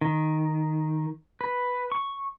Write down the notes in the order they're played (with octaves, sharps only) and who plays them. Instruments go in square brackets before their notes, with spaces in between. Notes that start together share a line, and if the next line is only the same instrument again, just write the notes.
[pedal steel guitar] D#3
B4
C#6